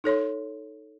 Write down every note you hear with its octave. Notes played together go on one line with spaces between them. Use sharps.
D#4 A4 C#5 C6